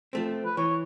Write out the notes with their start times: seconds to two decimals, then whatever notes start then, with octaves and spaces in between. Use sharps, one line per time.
0.13 F3 A3 C4
0.45 B4
0.57 E3 C#5